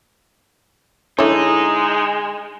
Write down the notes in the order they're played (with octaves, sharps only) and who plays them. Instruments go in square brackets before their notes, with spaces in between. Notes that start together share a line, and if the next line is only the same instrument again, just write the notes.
[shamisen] D3 C#5 [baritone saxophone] G#3 [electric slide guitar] D#4 [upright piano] E4